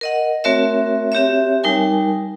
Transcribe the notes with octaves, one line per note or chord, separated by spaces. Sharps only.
A#4 D#5 F#5
A3 C4 F#4 A#4 C#5 E5
C4 G4 C#5 E5
G3 D#4 A#4 G#5